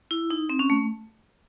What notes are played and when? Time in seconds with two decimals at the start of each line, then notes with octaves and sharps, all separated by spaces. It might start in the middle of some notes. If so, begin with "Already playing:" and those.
0.11 E4
0.30 D#4
0.50 C4
0.59 C#4
0.70 A3